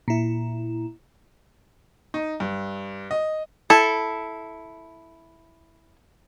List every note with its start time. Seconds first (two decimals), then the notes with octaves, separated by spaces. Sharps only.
0.08 A#2 E4
2.14 D#4
2.40 G2
3.11 D#5
3.70 E4 A4